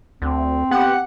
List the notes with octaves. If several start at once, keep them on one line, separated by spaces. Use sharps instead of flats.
D2 C4
B3 G4 F#5